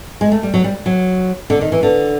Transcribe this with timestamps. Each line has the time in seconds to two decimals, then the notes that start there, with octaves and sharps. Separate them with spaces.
0.21 G#3
0.32 A3
0.43 G3
0.54 F#3
0.64 G3
0.86 F#3
1.50 D3
1.61 D#3
1.72 E3
1.83 D3